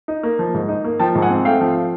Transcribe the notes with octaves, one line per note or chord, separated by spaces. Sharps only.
D#4
A#3
F3
G#2
D#4
A#3
F3 G5 A5
G#2
F#5 G#5
C4
A3 F5 G5
F3